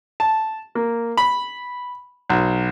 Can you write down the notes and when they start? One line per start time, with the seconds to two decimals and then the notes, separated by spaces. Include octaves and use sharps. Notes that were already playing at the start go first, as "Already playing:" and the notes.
0.20 A5
0.75 A#3
1.17 B5
2.30 B1